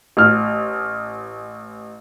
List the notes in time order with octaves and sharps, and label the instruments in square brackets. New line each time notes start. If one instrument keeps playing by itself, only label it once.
[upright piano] A1 F6